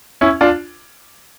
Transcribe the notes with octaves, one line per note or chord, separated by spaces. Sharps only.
C#4 E4
D4 F4